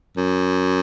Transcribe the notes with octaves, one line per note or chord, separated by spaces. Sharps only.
F#2